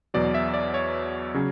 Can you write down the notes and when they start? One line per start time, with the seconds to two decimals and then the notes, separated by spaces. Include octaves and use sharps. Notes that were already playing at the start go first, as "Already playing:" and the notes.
0.14 E2 B2 F#3 D5
0.34 E5
0.54 D5
0.74 C#5
1.34 C#3 F#3 C#4